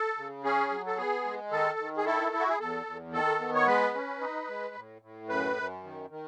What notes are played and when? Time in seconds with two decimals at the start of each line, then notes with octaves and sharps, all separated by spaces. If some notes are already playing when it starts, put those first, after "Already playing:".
Already playing: A4
0.17 C#3
0.44 C#4 G#4
0.70 F#3
0.87 A4
0.97 B3 G#4
1.25 G#3
1.51 D#3 A4
1.78 D#3
1.98 G#4
2.05 E4 A4
2.32 E4
2.40 F#4
2.49 G#4
2.60 E2 A4
2.86 E2
3.13 D#3 A4
3.40 B3
3.55 C#5
3.67 G#3 B4
3.94 C#4
4.21 D#4
4.48 G#3
4.75 A2
5.02 A2
5.29 F#2 B4
5.56 F#2
5.83 D#3
6.10 D#3